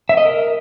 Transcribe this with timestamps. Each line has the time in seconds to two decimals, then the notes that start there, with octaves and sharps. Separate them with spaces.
0.09 E5
0.17 D#5
0.25 A#4